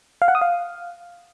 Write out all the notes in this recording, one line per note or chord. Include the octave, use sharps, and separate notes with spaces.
F5
F#5
D#6
F5